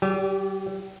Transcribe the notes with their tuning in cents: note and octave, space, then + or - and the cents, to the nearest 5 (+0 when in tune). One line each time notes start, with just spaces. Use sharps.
G3 -40 G4 +5